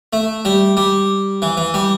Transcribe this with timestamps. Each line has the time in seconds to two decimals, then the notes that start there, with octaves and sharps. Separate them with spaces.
0.13 A3
0.45 G3
0.77 G3
1.42 E3
1.57 E3
1.74 G3